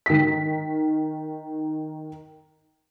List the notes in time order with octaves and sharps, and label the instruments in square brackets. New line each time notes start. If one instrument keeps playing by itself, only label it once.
[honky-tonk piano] D#3 B6